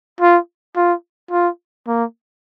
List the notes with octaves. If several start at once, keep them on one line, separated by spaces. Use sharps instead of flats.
F4
F4
F4
A#3